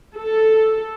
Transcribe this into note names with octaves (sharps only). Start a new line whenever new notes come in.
A4